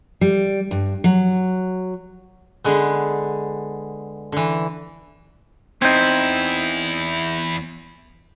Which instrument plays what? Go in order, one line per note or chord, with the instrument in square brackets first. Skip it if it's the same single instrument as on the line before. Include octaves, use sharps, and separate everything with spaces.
[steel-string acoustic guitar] G3
G2
F#3
[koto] D3 G#3 B3
D3 E3
[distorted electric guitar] E2 E4 [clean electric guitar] C4 D#4 [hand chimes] G6 G#6